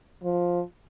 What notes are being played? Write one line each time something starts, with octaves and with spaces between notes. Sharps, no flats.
F3